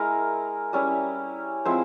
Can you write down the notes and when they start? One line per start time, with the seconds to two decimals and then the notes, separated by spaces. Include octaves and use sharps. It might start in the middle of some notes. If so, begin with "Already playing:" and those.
Already playing: G#3 E4 A#4
0.73 G3 C#4 E4
1.65 F3 G#3 C4 E4 C5